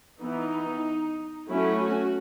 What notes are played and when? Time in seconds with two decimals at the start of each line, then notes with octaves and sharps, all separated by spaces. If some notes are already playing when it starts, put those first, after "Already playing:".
0.22 E3 B3 D#4
1.50 F#3 A3 C#4 E4
1.81 F#4